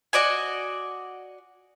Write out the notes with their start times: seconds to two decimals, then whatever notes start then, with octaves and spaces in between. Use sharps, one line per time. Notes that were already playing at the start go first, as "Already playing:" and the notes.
0.13 F#4 D5 D#5 G#5